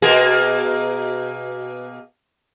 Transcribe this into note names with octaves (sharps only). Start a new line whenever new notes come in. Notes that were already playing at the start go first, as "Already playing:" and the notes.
B2 A#3 G#4